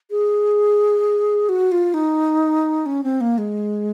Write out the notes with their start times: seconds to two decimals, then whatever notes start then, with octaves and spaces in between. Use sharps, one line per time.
0.11 G#4
1.49 F#4
1.72 F4
1.94 D#4
2.86 C#4
3.04 C4
3.21 A#3
3.38 G#3